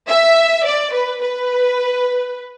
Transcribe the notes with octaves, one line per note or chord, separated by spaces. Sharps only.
E5
D5
B4
B4